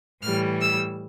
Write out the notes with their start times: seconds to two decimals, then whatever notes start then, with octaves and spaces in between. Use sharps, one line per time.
0.23 A2 E3 G3 F6
0.61 E6